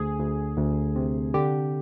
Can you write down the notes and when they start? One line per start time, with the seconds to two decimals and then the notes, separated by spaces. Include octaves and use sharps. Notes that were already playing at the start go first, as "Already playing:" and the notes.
Already playing: D2 G#4
0.19 D2
0.57 D2
0.96 C3
1.34 D3 G4